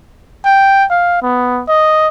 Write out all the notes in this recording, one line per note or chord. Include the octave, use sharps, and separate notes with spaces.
G5
F5
B3
D#5